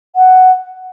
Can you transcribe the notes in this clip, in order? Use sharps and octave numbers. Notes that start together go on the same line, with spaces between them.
F#5